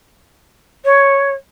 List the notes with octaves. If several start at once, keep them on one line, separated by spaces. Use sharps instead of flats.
C#5